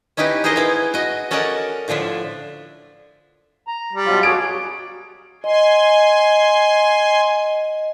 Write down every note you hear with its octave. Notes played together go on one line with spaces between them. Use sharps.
C#4 D#4 E4 G4 B4
D#4 G#4 A#4 C5 D#5
B3 E4
F#4 D#5
C#4 A4 A#4 D5 D#5 F#5
A2 D3 F3 D4 E5
A#5
G3
B2 F#3 F4
F#4 G#4 C#5 D6 D7
D#5 G#5 C6